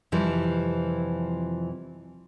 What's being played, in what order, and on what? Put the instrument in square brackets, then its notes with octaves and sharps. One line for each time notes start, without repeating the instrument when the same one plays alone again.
[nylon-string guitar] F2 C3 E3 F3 G3